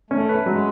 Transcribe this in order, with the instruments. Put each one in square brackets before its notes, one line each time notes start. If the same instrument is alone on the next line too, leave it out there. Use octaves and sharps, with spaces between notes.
[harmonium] A3 [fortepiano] C#4
[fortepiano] B4
[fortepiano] F#3 [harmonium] G#3